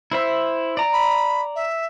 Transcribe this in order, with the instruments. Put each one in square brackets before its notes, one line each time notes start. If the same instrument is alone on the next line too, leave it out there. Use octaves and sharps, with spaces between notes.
[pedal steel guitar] E4 C5 E5
D5 A#5
[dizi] B5
E5